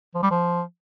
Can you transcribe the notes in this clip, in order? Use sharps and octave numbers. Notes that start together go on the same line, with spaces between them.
F3
G3
F3